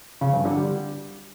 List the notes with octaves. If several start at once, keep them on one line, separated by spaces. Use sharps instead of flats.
C#3
G2
D3
G3